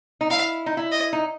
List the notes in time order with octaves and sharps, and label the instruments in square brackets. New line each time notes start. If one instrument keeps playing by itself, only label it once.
[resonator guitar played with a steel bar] D#4
[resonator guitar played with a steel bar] E4 [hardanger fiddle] F5
[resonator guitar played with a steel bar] D#4
E4
[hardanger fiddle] D#5
[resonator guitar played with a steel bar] D#4